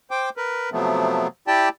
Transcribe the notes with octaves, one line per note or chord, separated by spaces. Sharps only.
C5 G5 D6
A#4 B4
C3 F3 F#3 A3 B3
E4 G4 D5 G5 A5